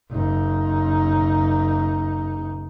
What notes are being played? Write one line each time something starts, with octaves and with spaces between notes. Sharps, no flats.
F#1 D#4